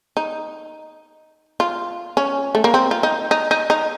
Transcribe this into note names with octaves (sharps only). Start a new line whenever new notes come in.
D#4
F4
C#4
A3
A#3
C4
F4
D#4
D#4
D#4
D#4